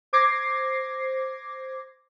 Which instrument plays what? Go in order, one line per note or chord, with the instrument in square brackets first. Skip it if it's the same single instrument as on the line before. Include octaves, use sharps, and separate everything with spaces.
[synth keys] C5 D6 G#6 A#6 C7